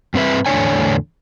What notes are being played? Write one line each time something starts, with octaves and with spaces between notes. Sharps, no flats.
G2 C4 B4 E5
E2 A2 D3 D4 C#5 G#5